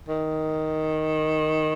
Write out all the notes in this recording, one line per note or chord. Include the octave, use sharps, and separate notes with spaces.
D#3